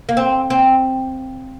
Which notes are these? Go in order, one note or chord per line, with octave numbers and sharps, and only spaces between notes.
A#3
C4
C4